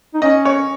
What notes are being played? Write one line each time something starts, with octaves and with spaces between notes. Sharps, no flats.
D#4
C#4 D#5
C#5